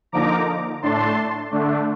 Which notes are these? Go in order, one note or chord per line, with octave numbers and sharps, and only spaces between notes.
D3 F3 A#3 D#4 A#5 D6
A2 A3 D4 A5 C6
D3 A3 D4